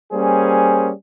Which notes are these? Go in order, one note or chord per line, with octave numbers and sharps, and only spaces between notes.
G3 A#3 C#4 G#4 C5